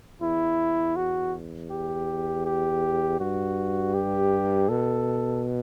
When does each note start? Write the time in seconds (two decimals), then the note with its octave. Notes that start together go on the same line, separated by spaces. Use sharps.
0.21 E2 E4
0.96 F#4
1.71 G4
2.46 G4
3.20 G2 F#4
3.94 G4
4.69 B2 A4